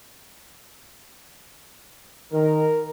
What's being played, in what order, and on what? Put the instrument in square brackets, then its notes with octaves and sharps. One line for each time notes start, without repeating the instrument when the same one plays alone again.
[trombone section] D#3 [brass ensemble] A#4